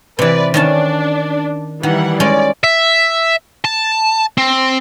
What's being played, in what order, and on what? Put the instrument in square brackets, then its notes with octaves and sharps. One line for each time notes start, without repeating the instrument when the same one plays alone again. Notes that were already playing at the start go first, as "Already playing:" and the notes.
[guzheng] C3 E3 [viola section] B4 D5
[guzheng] D#3 C#4 A5 [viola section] D4
[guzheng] D#3 [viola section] E3 G3 F#5
[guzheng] G#3 C#4 [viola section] D5
[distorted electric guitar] E5
A5
C4